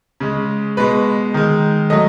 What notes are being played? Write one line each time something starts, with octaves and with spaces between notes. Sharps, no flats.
C#3 G#3
B2 G#3 B4
D#3 G#3
F#3 A3 D#5